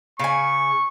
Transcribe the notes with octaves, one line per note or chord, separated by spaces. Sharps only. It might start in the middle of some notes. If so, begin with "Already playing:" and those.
C#3 G#5 C#6